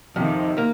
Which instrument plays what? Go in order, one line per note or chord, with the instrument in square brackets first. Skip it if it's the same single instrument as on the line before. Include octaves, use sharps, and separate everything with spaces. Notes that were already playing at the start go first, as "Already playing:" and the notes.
[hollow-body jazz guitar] F2 [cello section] C3 D#3
[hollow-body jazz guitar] A#3